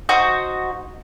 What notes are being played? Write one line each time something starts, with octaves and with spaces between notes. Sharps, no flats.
D#4 F#4 C5